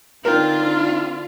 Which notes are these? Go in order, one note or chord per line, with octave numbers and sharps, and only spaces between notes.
D3 C4 D4 D#4 F4 A#4 G5